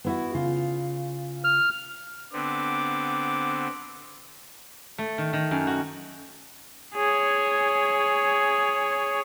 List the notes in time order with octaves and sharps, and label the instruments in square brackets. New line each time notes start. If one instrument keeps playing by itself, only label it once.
[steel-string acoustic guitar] B3 E4 F#4
C#3 F4
[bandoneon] F6
[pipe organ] D3 B3 C4 [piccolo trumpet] D6
[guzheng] A3
D#3
D#3
F#2
F#4
[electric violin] G#4 C#5